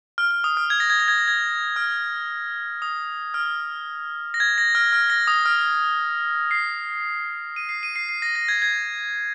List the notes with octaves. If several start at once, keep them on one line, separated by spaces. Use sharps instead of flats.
F6
F6
D#6
F6
G#6
A#6
G#6
A#6
G#6
A#6
G#6
F6
D#6
F6
A#6
G#6
A#6
F6
F6
A#6
D#6
F6
C7
D#7
C7
D#7
C7
C7
A#6
A#6
G#6
G#6